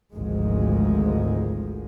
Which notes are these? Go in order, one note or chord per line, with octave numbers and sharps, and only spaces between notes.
G#1 D2 G#2 F3 G#3